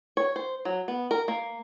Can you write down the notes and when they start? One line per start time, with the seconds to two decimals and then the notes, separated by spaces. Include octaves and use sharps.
0.17 C#5
0.36 C5
0.65 F#3
0.88 B3
1.11 A#4
1.28 A#3